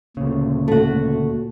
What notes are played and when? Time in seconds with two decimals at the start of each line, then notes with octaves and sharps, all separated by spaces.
0.17 D2 A#2 C#3
0.68 A3 F#4